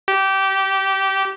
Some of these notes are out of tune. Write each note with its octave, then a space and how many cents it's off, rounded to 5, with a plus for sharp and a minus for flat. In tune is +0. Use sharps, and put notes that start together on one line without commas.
G4 -20